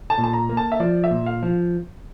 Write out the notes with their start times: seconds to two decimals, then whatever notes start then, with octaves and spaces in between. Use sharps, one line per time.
0.10 A5
0.18 A#2
0.24 A5
0.33 A#5
0.49 A#3
0.57 A5
0.72 E5
0.80 F3 D5
1.04 E5
1.11 A#2
1.26 F5
1.43 F3